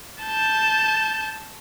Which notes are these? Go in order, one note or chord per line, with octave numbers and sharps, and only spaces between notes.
A5 G6